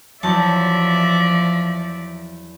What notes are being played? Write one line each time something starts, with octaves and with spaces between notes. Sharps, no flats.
E2 F3 F#3 D5 E5 A5